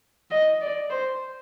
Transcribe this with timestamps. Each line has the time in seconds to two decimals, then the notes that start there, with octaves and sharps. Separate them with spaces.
0.31 D#5
0.61 D5
0.89 C5